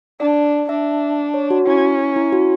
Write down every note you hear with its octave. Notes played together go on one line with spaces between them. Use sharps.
D4 D5
D4 E5
C#5
F#4
C#4 E4
E4
F#4